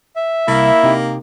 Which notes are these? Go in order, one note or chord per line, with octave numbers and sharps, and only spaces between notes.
E5
C2 A#3 E4
C3 D#4 G4